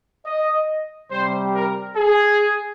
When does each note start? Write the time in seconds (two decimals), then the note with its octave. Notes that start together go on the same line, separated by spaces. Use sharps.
0.26 D#5
1.11 C3 G3 C5
1.54 A#4
1.96 G#4